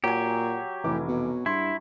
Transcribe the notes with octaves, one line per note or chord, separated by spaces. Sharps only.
A#2 F#3 G4 G#5
F1 A2 E3 D6
B2
G2 E4 C6